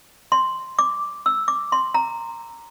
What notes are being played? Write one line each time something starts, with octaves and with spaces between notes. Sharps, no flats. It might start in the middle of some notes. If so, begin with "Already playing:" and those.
C6
D6
E6
D6
C6
A#5